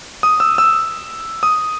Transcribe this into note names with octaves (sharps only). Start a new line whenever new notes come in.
D#6
E6
E6
D#6